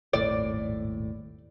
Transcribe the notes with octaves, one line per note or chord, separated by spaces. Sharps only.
D#1 G#1 A2 D5